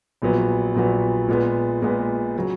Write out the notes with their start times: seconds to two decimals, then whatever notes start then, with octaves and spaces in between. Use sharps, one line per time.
0.22 A#1 A#2 F#3 B3
0.75 A#1 A#2 F#3 B3
1.28 A#2 G#3 B3
1.82 A#2 G#3 B3
2.37 C#3 F#3